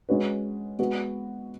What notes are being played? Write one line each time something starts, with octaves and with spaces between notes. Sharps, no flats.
G#3 C#4 F#4 B4
G#3 B3 F#4 B4